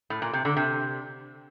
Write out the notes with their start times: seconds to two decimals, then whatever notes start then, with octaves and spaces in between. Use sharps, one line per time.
0.10 A2
0.22 A#2
0.33 C3
0.45 D3
0.57 C3